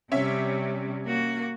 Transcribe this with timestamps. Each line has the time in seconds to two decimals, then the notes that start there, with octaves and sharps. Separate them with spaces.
0.12 C3 G3 C#4 E5
1.05 A#3 F#4